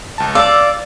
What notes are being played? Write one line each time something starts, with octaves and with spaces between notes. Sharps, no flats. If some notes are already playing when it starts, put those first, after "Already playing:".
C#2 A5
D5 F5 E6